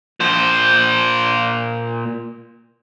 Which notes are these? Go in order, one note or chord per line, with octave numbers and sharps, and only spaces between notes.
A#2 C5